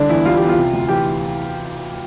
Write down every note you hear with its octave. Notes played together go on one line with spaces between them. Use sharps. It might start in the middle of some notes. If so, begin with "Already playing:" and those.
Already playing: C2 D3 D4
E2 E4
G3 F4
E2 G4
F4
C3
D2
E3 G4